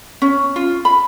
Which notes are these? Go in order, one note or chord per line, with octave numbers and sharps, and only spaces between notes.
C#4
F4
B5